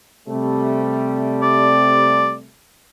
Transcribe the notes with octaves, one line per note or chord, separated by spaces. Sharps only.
C3 G3 A3
D5